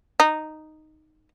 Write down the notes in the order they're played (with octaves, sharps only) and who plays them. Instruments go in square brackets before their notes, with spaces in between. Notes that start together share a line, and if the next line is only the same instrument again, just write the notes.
[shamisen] D#4